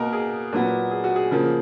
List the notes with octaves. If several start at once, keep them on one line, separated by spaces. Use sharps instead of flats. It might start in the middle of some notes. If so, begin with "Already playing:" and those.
Already playing: B2 A#3 A#4
G#4
A#2 F#3 B3
G#4
F#4
G#4
C#3 F3 A#3